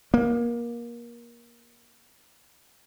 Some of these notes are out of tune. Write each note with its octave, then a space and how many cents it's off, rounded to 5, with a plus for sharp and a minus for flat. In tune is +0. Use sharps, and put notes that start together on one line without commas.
A#3 +25